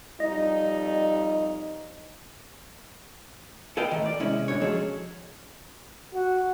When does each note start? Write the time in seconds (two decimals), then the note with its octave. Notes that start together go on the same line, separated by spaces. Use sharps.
0.20 F2 G3 D#4 D#5
3.77 A4 B4 D#5 F5 G5
3.91 A2 D#3
4.06 D5
4.20 C3 G#3 C#4 E4
4.48 G#2 D3 C#5
4.61 F3 F#3 G#3 C#4 G#4 A4
6.14 F#4